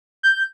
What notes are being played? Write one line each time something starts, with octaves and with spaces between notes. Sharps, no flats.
G6